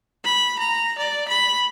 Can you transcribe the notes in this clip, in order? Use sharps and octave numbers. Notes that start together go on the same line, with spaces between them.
B5
A#5
D5
B5